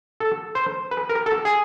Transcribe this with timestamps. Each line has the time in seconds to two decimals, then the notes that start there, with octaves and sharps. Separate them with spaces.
0.20 A4
0.55 C5
0.91 B4
1.09 A#4
1.26 A4
1.45 G#4